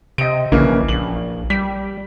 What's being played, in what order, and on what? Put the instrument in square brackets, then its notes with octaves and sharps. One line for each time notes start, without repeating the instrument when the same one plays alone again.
[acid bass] C3 [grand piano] D#5 D7
[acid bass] A#1 [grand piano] C#3 E3 A#3
[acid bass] A#1 [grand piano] F#7
[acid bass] G3 [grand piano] B6